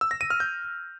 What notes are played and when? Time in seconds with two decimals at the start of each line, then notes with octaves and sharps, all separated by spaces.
0.01 E6
0.11 A#6
0.21 D#7
0.30 F6
0.40 G6